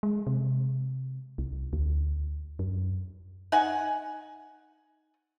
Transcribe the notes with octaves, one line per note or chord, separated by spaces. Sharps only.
G#3
C3
C2
D2
F#2
D#4 F#5 G#5